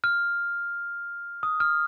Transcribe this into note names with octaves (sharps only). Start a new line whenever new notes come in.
F6
D#6
F6